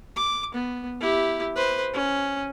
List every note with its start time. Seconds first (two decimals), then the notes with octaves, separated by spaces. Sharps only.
0.16 D6
0.55 B3
1.01 E4 G4
1.56 B4 C5
1.94 C#4